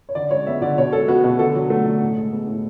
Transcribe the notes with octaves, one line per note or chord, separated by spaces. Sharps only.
C#5
D3 D5
G#3 C#5
B3 E5
D3 D5
B2 C#5
G#3 A4
B3 F#4
B2 F#4
D3 A4
F#3
A3
D3
A2
G#3
B3
A2